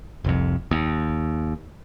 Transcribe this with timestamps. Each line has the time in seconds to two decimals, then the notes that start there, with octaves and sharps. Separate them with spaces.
0.24 F1 C2 F2
0.71 D#2